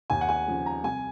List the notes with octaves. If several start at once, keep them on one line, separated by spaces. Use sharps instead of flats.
D#2 G#5
F#5
G#5
C#3 F3
A#5
C2 G#5